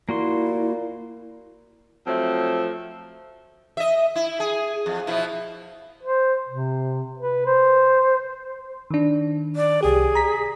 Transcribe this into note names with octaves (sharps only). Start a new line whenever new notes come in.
A#2 A#3 E4 F#4 C6
F3 F#3 A3 C4
D#5 E5
E4
G#4
F2
B2 F3 E4
C5
C3
B4
C5
D#3 D4
D5
C2 G4 G#4
A#5 B6